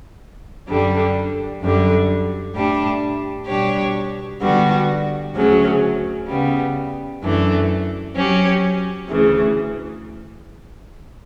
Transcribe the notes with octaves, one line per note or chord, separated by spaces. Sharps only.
F#2 D3 G3 D4
F#2 D3 G3
A2 G3 D4
B2 G3 D4 G4 C#5
D3 G3 B3 F#4
D2 C#3 F#3 C#4
C#3 G3 B3
F#2 E3 A3 D4
F#3 C#4 G4
D2 C#3 E3